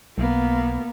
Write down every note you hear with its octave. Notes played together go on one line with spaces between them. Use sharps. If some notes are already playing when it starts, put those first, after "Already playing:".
B1 A#3 B3